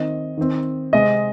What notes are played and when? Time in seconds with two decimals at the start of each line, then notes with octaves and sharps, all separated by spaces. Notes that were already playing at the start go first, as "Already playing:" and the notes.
Already playing: D#3 C4 D#5
0.38 D#3 C4
0.93 C3 G#3 C4 D#5